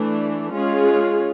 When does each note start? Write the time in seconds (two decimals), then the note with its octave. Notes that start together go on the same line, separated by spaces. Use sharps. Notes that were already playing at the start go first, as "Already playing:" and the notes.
Already playing: E3 A3 D4
0.52 G#3 C#4 F4 G#4